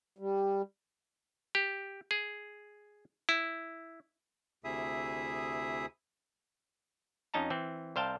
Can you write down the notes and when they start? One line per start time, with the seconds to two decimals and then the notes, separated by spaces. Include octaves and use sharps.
0.18 G3
1.55 G4
2.11 G#4
3.29 E4
4.64 D2 C3 E4 G#4 E5 D#6
7.34 F2 C#4 D#4 A5 A#5
7.50 E3 C4
7.96 C2 C5 F5 G5 A5